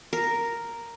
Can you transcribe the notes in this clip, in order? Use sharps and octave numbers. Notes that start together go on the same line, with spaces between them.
A#4